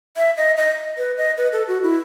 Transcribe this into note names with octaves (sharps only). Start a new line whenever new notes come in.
E5
D#5
D#5
B4
D#5
B4
A4
F#4
E4